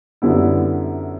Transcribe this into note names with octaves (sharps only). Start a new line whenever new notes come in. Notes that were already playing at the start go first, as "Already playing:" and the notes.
F#2 D3 G3 B3 E4